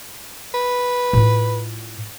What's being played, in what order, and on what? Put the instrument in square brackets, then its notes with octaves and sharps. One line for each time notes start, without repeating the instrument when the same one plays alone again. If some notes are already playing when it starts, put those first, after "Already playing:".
[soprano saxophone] B4
[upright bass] A2 F4